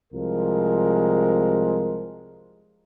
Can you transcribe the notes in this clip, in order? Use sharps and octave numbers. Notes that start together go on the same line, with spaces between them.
C2 F3 G#3 A#4